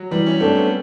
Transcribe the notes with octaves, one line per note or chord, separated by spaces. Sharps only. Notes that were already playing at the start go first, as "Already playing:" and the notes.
Already playing: F#3
E3 G3
C#4
A3 C4 D4
B3